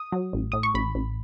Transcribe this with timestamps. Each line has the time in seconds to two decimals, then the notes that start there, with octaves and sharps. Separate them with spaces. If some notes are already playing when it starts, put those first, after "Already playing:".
Already playing: D#6
0.12 F#3
0.33 A1
0.52 A2 D#6
0.63 C#6
0.74 A1 B5
0.95 A1